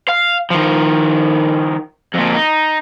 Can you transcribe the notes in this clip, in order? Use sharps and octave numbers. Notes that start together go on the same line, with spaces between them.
F5
D#3 F3
F2 A#2
D#4